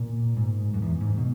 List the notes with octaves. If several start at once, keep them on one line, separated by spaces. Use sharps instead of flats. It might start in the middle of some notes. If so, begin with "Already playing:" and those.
Already playing: A#2
G#2
F#2
E2
G#2
B2